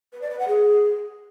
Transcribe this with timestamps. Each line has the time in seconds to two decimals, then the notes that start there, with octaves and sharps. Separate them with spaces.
0.13 B4
0.22 D5
0.30 B4
0.39 F#5
0.48 G#4